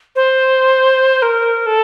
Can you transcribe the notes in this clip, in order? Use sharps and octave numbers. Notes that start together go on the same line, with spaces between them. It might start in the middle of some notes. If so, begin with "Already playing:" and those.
C5
A#4
A4